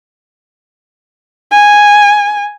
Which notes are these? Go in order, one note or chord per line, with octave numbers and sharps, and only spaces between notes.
G#5